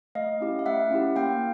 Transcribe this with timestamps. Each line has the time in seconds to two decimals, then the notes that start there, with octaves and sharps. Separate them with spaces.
0.15 A3 D#5 F5
0.41 C#4 E4 G4
0.59 F5
0.66 A3 E5 F#5
0.91 C#4 E4 G4
1.16 A#3 F5 G5